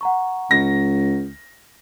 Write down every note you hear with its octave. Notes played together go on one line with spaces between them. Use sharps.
F#5 A#5 C#6
C#2 A#6